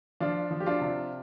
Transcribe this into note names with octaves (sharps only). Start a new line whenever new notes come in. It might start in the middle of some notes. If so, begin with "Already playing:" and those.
F3 D4 F4
F3
G4
D4 F4
C3